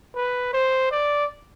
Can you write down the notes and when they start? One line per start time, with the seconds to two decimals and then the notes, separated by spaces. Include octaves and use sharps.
0.15 B4
0.53 C5
0.91 D5